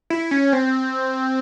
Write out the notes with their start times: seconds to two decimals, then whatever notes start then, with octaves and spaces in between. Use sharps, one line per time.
0.10 E4
0.31 C#4
0.53 C4